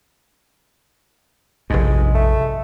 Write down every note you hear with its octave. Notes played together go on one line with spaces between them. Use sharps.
F1 A#1 G2 G#3
A3